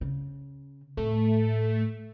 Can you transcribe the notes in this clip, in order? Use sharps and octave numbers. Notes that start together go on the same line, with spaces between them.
C#3
A2 A3